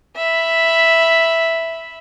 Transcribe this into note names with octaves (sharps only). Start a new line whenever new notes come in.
E5 B5